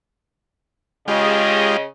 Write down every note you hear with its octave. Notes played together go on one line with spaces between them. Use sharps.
C#3 G#3 F4 G4 D#5